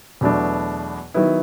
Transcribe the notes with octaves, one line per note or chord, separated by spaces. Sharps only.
E2 B2 F#3 A3 D4
D#3 F#3 B3 E4